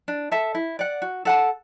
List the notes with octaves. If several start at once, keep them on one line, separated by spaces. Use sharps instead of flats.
D4
A4 E5 A5
E4
D5 F#5
F#4
A4 F#5 A5